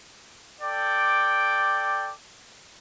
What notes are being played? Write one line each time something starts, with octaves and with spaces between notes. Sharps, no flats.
A4 D5 G5 D6